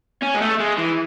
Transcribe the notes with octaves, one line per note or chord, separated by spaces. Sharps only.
C#4
G#3
A3
G#3
E3